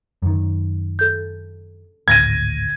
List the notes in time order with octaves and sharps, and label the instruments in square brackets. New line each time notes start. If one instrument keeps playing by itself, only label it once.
[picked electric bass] F#2 D#3
[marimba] A4 G6
[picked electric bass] G#1 D2 A2 [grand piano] G#6 A#6 D#7